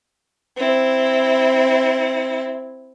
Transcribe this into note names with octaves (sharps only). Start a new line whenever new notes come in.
C4 E4